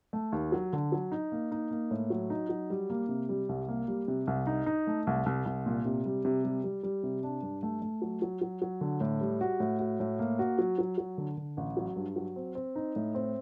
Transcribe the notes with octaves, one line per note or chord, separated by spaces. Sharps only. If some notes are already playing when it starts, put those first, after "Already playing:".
A3
D#2
F#3
D3
F#3
D#4
A#3
D#4
A#3
A2
F#3
D#4
F#3
G3
A#3
C3
G3
C2
A#3
G3
C3
C2
D#4
D#4
A3
C2
C2
C2
A#2
C3
G3
C3
G3
G3
G3
C3
D4
G2
A3
A3
F#3
F#3
F#3
F#3
D3
A2
G3
F#4
A2
F#4
A2
A#3
F#4
F#3
F#3
F#3
D3
D3
A1
F#3
G2
F#3
C4
C4
D#4
A2
C4